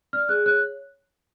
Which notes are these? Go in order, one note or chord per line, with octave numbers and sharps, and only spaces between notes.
D5 F6
G#4 F#6
C#5 F#6